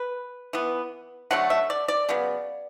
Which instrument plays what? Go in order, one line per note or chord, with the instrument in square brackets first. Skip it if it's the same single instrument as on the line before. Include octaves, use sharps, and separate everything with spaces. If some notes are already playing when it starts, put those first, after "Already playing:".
Already playing: [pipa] B4
E3 B3
D3 F#3 A3 F#5
E5
D5
D5
C#3 F#3 B3